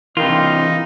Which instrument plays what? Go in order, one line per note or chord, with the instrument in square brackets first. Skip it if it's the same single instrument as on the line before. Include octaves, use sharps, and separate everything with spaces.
[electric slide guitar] C3 E3 [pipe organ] D#4 [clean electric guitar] F4 [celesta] A#4 G5 B5